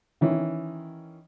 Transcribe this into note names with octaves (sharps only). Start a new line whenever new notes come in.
D#3 E3 C#4